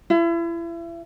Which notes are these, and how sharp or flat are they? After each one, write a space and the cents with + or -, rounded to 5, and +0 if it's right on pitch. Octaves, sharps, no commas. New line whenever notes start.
E4 +35